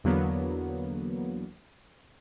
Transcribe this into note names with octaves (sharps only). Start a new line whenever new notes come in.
E2 D3 F#3 A#3 B3